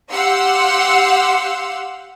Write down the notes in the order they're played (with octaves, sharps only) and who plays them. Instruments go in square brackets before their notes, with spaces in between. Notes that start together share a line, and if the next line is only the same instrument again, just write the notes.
[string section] G4 F5 F#5 C6 E6